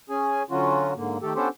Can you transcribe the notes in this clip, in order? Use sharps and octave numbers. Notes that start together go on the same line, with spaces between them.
C#4 G#4 G#5
D3 F#3 C#4 F4 F#4
G#2 D3 A#3
D#3 A3 G4 A4
B3 C#4 D4 G4 A4 C5